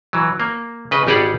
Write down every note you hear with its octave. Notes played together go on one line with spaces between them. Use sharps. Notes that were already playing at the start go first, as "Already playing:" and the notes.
E3 F#3
A#3
C#3 B4 D#5
G#1 G3 G4 G#4 D5 F#5